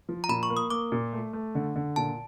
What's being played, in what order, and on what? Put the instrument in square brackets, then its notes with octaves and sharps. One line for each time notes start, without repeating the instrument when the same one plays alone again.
[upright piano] F3
[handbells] A#5
[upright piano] A#2 [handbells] B5
[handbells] C#6
[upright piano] A#3
[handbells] D#6
[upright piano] A#3 [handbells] D6
[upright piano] A#2
A3
A3
D3
D3
[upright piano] A#2 [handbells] A5